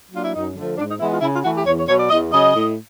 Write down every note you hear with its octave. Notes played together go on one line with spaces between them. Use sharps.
F#3 A#3 D4 F4
E4
F#2 D#4
D3 F3 A3
G#2 D4
D#4
E3 G#3 B3 E4
F4
C#3 E4
F4
E3 A3 F#4
G4
E2 C#5
C#5
B2 F#3 C#5
D5
E2 D#5
C#3 F#3 D#5
A2